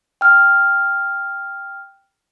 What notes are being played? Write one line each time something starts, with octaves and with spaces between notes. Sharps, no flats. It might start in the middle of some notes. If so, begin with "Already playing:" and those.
G5 F6